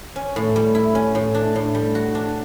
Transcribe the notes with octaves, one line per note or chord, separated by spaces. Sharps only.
C#4
A2
G3
E4
C#4
A2
D4
A2
G3
F#4
D4